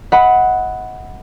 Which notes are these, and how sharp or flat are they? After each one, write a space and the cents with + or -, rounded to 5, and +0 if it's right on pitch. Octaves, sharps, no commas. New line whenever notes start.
D#5 +35 F#5 +0 B5 +5